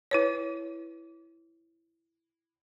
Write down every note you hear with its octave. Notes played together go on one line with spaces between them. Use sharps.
E4 B4 C#5